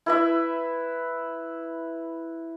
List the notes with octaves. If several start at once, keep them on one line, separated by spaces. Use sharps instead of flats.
E4 B4 E5